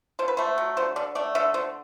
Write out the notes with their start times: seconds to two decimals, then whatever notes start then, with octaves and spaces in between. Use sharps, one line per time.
0.19 D3 C5
0.28 B4
0.37 A3 C5
0.58 F#3
0.77 D3 C5
0.96 D3 D5
1.15 A3 D5
1.35 D3 E5
1.54 D3 C5